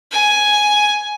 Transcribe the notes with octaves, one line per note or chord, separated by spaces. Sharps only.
G#5